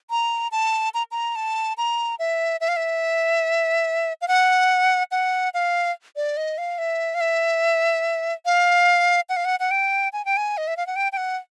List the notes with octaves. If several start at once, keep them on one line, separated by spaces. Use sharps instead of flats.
A#5
A5
A#5
A#5
A5
A#5
E5
E5
F5
E5
F5
F#5
F#5
F5
D5
D#5
F5
E5
F5
E5
F5
F#5
F5
F#5
F#5
G5
G#5
G5
G#5
D#5
E5
F5
F#5
G5
G5
F#5